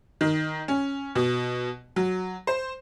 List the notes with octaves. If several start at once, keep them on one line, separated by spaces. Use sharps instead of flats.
D#3
C#4
B2
F#3
C5